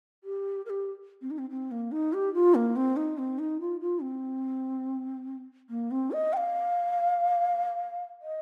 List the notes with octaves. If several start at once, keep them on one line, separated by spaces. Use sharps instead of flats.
G4
A#4
G4
C4
D#4
C4
C4
A#3
D#4
G4
F4
A#3
C4
D#4
C4
D#4
F4
F4
C4
A#3
C4
D#5
G5
F5
D#5